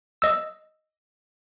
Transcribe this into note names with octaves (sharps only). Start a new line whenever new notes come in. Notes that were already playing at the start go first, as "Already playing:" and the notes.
D#5 E6